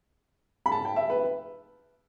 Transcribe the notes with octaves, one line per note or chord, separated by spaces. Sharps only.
B5
A5
G5
E5
B4